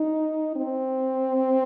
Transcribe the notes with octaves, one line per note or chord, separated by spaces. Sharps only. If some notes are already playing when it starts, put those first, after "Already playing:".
Already playing: D#4
C4